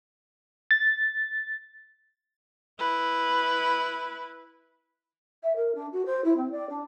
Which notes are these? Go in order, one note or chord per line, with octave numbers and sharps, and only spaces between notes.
A6
E4 B4
E5
A#4
D4
F#4
C5
E4
C4
D5
D4